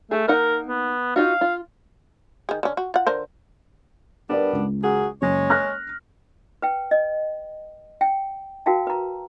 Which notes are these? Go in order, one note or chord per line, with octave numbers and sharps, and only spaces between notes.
A3 G#4
A#3 D#4 A#4 F#5
B3
D#4 F4 F#4 F5
F4
D#3 G#4
D3 C#4
F#4
F4 F#5
D3 A#4 C5
G3 B3 D4 A#4 B4 D5
C#2
F#2 F#4 G#4
F#1 G#3 C#5
F6 F#6 A#6
B4 G5
D#5
G5
F#4 A#4 F5 G5 A5
B4 A#5